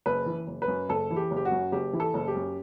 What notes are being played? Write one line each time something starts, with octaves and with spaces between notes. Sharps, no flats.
F#1 B4
E3
F#1
B4
F#2
F#1 A4
E3
G4
F#1
G4
F#4
F#2
F#1 G4
E3
A4
F#1
G4
F#2